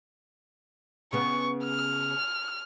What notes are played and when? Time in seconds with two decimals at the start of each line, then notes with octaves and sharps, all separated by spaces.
1.13 C#3 B3 C#6
1.64 F6